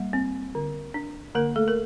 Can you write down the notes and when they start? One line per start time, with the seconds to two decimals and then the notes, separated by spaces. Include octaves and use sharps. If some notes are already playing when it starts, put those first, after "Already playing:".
Already playing: G3 A#3
0.13 C4
0.55 D3
0.94 D4
1.35 D3 A#3 A#4
1.56 A3 A4
1.68 A#4